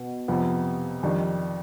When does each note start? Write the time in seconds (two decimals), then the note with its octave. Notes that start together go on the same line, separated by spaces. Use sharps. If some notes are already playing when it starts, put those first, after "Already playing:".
Already playing: B2 B3
0.28 F2 C3 F3 B3
1.03 F2 D#3 G3 D4